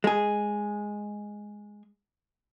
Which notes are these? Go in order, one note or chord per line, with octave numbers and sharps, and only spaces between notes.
G#3 G#4